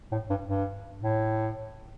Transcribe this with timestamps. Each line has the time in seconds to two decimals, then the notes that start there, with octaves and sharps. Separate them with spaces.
0.12 A2
0.30 G2
0.48 G2
1.02 A2